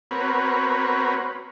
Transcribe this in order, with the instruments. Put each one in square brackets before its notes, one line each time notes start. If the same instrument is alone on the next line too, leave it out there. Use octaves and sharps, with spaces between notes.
[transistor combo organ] B3 C4 F#4 A#4 B4 C#5